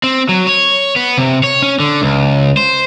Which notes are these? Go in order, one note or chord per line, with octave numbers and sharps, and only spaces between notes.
C4
F#3
C#5
B3
C3
C#5
C#4
D3
C#2
C5